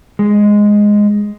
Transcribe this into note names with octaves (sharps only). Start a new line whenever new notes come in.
G#3